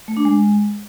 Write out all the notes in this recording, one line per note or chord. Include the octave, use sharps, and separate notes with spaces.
A3
D4
G#3